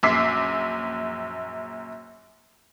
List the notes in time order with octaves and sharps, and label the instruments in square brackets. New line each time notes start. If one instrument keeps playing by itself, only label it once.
[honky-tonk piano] A#1 F#2 D6 E6 B6 C7